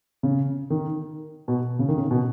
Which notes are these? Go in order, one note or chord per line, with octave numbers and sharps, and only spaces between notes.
C#3
D#3
B2
C#3
D#3
C#3
B2